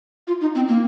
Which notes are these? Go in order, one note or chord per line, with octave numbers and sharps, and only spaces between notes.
F4
D#4
C4
A#3